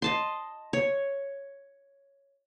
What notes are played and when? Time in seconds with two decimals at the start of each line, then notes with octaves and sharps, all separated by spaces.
0.02 D#5 A5 C6
0.73 C#5